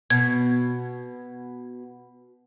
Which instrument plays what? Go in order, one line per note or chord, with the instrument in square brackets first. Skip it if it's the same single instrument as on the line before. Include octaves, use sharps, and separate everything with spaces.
[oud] B2 [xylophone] G#6